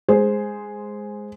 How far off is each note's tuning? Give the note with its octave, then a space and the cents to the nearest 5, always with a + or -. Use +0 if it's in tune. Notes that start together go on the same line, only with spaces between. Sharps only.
G#3 +0 G#4 +0 C5 +0